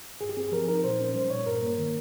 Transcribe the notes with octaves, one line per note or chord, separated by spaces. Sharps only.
G2 G#4
G4
C4 G#4
F3 A#4
D#4 A#4
A#2 C5
C#4
G3 C5
A#2 C#5
G2 A#4
A#3
D#3